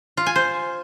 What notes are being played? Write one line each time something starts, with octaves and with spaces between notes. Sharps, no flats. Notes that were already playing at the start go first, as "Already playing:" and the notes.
F4
G#5
C5